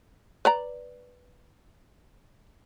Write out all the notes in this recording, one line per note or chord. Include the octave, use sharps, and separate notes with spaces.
B4 D5 A#5